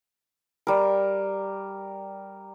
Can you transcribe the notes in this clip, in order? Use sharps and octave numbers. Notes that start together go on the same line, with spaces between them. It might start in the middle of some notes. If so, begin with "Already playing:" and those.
G3 A#4